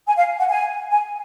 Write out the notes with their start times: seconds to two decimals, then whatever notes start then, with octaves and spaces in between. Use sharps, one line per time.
0.07 G#5
0.17 F5
0.39 F#5
0.50 G#5
0.91 G#5